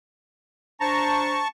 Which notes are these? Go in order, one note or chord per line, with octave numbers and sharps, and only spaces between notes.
D4 C5 A5 A#5 C#6